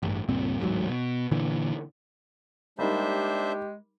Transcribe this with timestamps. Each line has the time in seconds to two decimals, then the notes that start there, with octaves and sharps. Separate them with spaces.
0.03 A1 G2
0.29 C#2 G2 A#2 C4
0.60 D1 A1 G#2 F#3
0.89 B2
1.31 A#2 D3 E3
2.79 G3 G#3 A#3 D4 D#4 G4 C5 E5